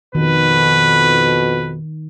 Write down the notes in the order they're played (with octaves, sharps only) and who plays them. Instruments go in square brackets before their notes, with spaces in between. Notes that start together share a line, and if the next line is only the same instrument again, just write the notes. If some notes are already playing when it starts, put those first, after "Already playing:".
[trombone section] F2 B2 [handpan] D#3 [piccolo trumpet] B4